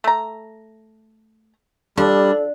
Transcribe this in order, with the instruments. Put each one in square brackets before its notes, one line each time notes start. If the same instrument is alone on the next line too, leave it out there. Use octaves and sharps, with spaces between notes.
[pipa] A3 A#5
[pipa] F3 [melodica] G3 [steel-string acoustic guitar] D4 [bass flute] A4